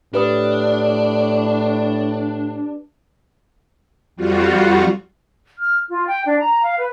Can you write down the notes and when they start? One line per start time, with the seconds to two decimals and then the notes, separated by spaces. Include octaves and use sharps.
0.14 A2 D4 G4 B4 D#6
4.16 F2 G3 F4 F#4
5.59 F6
5.88 F4
6.08 G5
6.25 D4
6.40 A#5
6.63 F5
6.78 B4